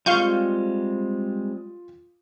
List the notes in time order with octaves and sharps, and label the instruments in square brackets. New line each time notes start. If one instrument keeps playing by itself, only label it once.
[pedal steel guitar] G3 G#3 C4 [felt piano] F4 D#7 [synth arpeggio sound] F5 C#6 G6